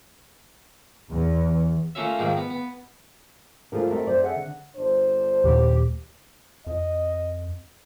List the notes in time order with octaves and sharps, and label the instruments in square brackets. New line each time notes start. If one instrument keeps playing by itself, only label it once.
[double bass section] E2
[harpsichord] A3 A#3 C#4 F4 C#5 E5
G#2 D#3 F3 G#3 A#3
B3
B3
[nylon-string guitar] D3 F3 A3 [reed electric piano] F4 G#4 A#4
[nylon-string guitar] A3 C4 D#4 [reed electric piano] F#4 A#4
[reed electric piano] F#2 D5 [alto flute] C5
[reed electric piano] G#4 E5 [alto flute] F#5
[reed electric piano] D3
[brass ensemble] G1 D4 C5
[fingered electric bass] D#2 A#2 A3 [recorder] G4
[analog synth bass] F2 [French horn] D#5